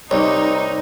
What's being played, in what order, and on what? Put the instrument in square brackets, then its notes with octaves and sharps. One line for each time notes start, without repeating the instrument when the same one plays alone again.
[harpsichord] C2 [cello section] D#4 [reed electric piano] C#5 D6